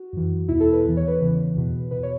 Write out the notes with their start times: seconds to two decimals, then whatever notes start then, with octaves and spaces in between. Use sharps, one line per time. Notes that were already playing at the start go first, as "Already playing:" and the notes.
Already playing: F#4
0.13 F#2 E3
0.48 E2 B2 E4
0.60 A4
0.73 B4
0.85 E2 E3
0.97 C#5
1.08 B4
1.20 E2 C#3 E3
1.55 E2 B2
1.91 E2 B2 B4
2.03 C#5